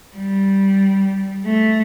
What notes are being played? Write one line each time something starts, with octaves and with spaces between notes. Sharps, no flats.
G3
A3